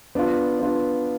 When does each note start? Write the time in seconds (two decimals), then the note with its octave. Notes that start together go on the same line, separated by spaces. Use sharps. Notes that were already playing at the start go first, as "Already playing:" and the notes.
0.15 B3 D4 F4
0.60 B3 D4 F4